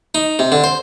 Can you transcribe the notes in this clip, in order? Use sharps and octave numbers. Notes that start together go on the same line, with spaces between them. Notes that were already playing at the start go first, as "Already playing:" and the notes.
D#4
C3
D3
C5